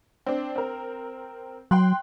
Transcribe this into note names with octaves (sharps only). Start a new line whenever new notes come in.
C4 D4
C4 A#4
F#3 G5 C6 F#6